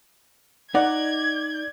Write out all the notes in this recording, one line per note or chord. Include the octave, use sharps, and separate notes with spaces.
D#4 D5 F#5 G#6